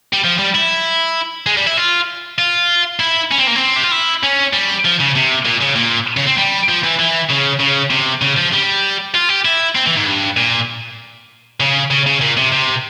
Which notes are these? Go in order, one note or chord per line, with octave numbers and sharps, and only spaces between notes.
G3
F3
G3
E4
G#3
G3
E4
F4
F4
E4
C#4
C4
A#3
C4
G4
F4
E4
C#4
G3
F3
C#3
C3
A#2
C#3
A#2
C#3
C4
G3
F3
E3
E3
C#3
C#3
C3
C#3
F3
G3
F4
G4
E4
C4
E3
G#2
G2
A#2
C#3
C#3
C#3
A#2
C3
C3